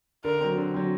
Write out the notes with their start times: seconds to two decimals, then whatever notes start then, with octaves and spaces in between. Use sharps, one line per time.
0.24 D3 A#4
0.41 F#3 C4
0.58 D3
0.74 F#3 C4